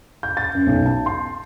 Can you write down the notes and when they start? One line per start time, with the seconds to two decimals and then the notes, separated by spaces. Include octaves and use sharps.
0.23 G6
0.37 A6
0.54 F#2
0.67 B1
0.86 A5
1.06 C6